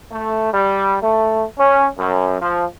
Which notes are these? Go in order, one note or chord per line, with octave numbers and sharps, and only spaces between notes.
A3
G3
A3
C#4
F#2
F3